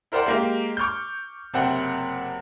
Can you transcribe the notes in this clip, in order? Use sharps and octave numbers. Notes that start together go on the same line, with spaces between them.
E4 A#4 C5 D5 F#5
G#3 A#3 G4
C#6 D6 F6 G6
F#1 C3 C4 E5 F#5